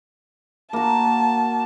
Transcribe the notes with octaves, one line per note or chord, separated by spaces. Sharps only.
A#3 F#4 A5